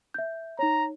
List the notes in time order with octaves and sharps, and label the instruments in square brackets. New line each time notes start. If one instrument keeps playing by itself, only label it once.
[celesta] E5 G6
[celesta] D#4 C#5 [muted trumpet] A#5